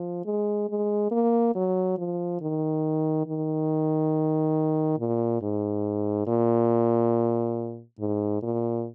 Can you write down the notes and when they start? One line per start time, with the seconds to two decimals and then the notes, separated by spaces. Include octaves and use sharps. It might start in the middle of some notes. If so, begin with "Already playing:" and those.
Already playing: F3
0.25 G#3
0.69 G#3
1.11 A#3
1.55 F#3
1.98 F3
2.41 D#3
3.27 D#3
4.98 A#2
5.42 G#2
6.27 A#2
7.99 G#2
8.42 A#2